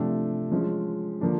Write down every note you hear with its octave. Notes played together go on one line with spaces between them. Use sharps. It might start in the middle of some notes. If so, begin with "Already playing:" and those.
Already playing: C3 F3 A3 D4 G4
F3 G#3 C#4
D3 F3 A#3 D4